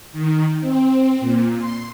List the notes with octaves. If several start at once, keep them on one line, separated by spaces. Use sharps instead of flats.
D#3
C4
A#2
C6